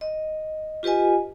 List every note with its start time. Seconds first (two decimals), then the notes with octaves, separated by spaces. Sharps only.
0.01 D#5
0.83 F4 G4 B4 D#5 G#5